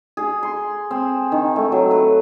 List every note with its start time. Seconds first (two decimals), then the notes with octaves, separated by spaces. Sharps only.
0.17 G#4
0.43 C6
0.91 C4
1.32 D#3
1.56 A3
1.72 F#3
1.91 B4